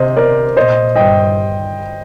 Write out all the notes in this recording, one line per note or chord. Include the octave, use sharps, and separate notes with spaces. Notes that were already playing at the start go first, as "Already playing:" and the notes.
Already playing: C3 C5 D#5
A#4 D5
A#2 C5 D#5
G2 D#5 G5